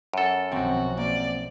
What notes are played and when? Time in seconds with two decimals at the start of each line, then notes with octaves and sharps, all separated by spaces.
0.14 F#2 A4
0.52 B1 D#3 F3 C4 F#4 G5
0.98 A#3 C4 D5